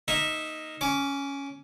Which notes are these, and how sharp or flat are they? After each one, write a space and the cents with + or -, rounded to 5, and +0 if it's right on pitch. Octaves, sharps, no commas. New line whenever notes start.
A#3 +0 D#4 +0 E5 -10
C#4 +5 D6 -20